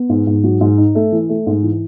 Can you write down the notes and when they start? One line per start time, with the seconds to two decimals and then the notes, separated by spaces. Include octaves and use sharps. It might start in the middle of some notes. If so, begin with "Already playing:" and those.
Already playing: B3
0.09 G#2
0.27 G#2
0.44 F#3
0.61 G#2
0.78 D#4
0.95 A3
1.12 E3
1.29 A3
1.46 G#2
1.63 E3